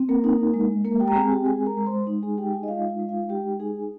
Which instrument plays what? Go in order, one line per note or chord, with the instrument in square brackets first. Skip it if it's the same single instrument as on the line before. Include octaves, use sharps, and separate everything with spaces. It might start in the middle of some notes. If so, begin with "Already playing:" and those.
Already playing: [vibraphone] C4
A#3 A#4
D#4
G#3
G#3 A#3 A#4
G4 G5
A#5
C4 G#4 G#5
G4 G5
G#3 G#4 G#5
A#4 A#5
G#3
C5 C6
D#4
G#4 G#5
D#4 G4 G5
G#4 G#5
D#5
G#3 F4 F5
F4 F5
G#3
F4 F5
D#4 G4 G5
D#4 G#4 G#5